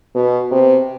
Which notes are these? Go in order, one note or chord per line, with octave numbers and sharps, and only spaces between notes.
B2
C3